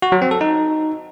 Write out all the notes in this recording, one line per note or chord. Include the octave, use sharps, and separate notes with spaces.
F#4
F#3
C4
A4
D#4